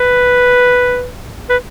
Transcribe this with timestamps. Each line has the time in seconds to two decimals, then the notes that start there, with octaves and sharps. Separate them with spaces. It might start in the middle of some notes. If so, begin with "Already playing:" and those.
Already playing: B4
1.49 B4